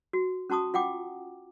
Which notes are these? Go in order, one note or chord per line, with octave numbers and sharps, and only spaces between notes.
F#4
C#4 F#4 A5 C#6 D#6
F4 F#5 G5 D6